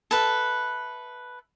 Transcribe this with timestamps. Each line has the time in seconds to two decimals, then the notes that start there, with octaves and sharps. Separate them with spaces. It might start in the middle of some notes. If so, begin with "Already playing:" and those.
0.11 A4 B4 E5